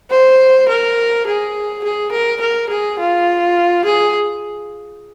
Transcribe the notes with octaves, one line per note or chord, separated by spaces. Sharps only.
C5
A#4
G#4
G#4
A#4
A#4
G#4
F4
G#4